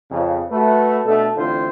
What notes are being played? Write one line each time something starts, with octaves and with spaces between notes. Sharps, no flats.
F2 C#3
A3 F#4 B4
B2 A3 D4 A4
A1 D3 C4 E4 F4 C5